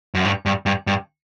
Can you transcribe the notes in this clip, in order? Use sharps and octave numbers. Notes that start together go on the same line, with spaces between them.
F#2
G2
G2
G2
G2